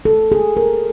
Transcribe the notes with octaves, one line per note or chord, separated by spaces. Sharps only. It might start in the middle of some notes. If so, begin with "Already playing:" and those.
A4
G#4
A#4